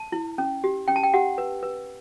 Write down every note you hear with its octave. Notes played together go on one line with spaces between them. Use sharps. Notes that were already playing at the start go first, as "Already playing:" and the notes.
Already playing: A5
E4
C#4
G4
C#4 G5
A5
G5
G4 F#5
B4
B4